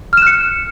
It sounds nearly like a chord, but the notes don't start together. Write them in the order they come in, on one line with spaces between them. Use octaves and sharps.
F6 E7 F#6 C#7